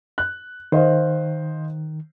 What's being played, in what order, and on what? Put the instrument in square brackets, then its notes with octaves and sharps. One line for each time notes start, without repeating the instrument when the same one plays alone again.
[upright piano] F#6
[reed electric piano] D#3 [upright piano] C5 D#5 F5